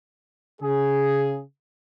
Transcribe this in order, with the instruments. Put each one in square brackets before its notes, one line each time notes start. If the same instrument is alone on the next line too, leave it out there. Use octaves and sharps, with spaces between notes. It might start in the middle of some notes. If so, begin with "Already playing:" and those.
[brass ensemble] C#3 G#4